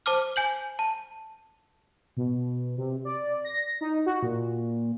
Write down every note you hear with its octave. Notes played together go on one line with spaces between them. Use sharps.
C5 A5 D6 F6
G#5 G6 F#7
A5
B2
C3
D5
A#6
D#4
F#4
A#2